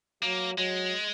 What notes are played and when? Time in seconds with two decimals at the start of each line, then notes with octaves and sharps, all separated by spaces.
0.23 F#3 A#3
0.58 F#3 G#3